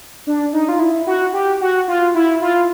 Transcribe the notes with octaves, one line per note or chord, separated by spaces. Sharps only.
D4
D#4
F4
E4
F#4
G4
F#4
F4
E4
F4